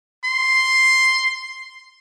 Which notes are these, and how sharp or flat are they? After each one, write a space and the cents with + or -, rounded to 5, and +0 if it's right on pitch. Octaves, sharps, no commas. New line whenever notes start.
C6 +0